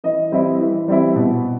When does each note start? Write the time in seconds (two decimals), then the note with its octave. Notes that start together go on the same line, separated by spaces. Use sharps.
0.04 E3 D#5
0.32 G3 C4 E4
0.60 E3
0.88 G3 C4 E4
1.16 B2